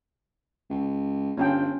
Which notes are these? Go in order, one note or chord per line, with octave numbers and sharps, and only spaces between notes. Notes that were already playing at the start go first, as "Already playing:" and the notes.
C#2
G1 C#4 F4 G5